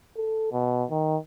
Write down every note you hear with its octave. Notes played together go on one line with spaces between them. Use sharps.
A4
B2
D#3